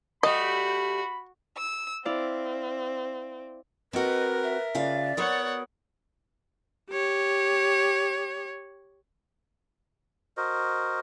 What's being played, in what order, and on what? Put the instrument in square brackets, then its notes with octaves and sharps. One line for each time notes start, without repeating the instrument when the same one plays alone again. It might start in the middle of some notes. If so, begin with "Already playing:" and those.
[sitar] G3 A3 [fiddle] F#4 [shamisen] D#5 [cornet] B5
[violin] E6
[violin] C4 [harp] E4 D5 F5
[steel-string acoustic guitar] C4 F#4 [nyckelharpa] A#4 [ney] B4 [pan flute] D#5
[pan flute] E5
[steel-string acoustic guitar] C#3 F4 F5 [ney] D5
[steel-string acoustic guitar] B3 F#4 A#4 [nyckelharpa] C#5 F#5 [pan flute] D#6
[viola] G4 C#5
[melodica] F#4 A#4 C5 D#5